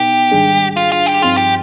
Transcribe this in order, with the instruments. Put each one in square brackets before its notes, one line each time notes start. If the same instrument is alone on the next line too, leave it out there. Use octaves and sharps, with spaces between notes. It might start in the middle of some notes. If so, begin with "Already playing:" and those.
Already playing: [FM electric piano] B2 B3 D#4 [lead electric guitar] G4
[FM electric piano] G#2 D#3 G3 D4 G#4
[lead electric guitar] F4
F4
G4
[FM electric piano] G2 F3 C4 D#4 G#4 [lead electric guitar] F4
[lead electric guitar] G4